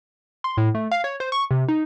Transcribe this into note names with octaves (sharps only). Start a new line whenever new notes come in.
C6
A2
A3
F5
C#5
C5
C#6
C3
D#4